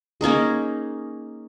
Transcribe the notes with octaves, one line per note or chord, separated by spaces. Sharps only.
A#3 C#4 D#4 G#4